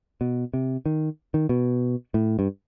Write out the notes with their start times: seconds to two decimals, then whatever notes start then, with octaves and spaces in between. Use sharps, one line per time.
0.21 B2
0.54 C3
0.86 D#3
1.34 D#3
1.49 B2
2.14 A2
2.39 G2